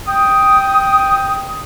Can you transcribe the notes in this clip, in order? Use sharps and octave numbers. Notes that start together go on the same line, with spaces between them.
G5 D#6